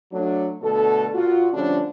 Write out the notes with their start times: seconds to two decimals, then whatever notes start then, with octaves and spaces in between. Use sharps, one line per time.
0.12 F#3 A3 D4
0.61 B2 D3 A3 A4
1.14 A#2 F4 F#4
1.53 D3 F3 G3 A3 C#4 D4